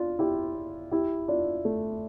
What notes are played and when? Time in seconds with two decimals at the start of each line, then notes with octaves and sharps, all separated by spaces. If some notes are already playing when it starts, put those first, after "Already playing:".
Already playing: D4 F4
0.19 E4 G4
0.91 E4 G4
1.28 D4 F4
1.65 A3